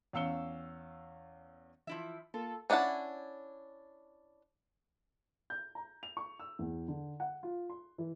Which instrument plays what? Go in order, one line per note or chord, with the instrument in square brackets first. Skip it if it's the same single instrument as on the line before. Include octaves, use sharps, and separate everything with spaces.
[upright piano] E2 C#4 F5 E6 C#7 G7
[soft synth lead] E3 [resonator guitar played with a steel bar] F3 E4 E5
[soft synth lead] A#3 [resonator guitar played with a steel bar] F4 [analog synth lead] A4
[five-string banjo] C#4 D4 E4 F#5 A5
[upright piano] G6
A#5
F7
C#6
E6
E2
D3
F#5
F4
C6
E3